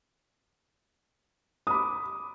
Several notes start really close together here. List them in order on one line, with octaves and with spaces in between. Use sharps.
D#6 B5 D6